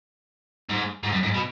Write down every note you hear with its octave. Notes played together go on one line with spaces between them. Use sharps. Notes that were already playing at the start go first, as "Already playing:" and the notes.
G#2
G#2
F#2
G#2
B2